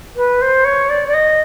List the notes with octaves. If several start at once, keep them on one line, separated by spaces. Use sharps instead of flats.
B4
C5
C#5
D5
D5
D#5